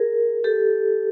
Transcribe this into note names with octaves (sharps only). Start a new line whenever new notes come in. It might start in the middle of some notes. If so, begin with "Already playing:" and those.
Already playing: G#4 A#4
G4 A4